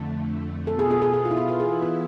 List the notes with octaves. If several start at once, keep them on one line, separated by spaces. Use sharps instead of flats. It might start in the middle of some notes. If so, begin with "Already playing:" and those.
Already playing: F2 D3 A3
B2 B3 F4 A4
G#4
G#4
G#4
G#4
F4
E4
F4
F4
E3 B3 E4 G#4
F4